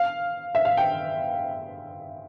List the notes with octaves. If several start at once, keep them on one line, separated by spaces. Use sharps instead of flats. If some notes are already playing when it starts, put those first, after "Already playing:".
Already playing: F5
E5
F5
G5